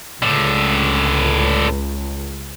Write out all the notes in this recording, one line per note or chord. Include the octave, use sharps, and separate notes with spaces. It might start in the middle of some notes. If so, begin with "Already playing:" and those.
C#2 A2 D3